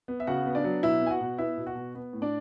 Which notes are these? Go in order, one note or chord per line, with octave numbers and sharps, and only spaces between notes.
B3
E5
C#3 F#4 F#5
B3
D4 D5
F#3
B2 E4 E5
B3 G#5
F#4 F#5
B2
B3 E4 E5
B2
F#4 F#5
B2
B3
A2
D4 D5